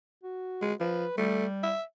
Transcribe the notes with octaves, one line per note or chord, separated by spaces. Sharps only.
F#4
G#3
F3 B4
G3 A3
E5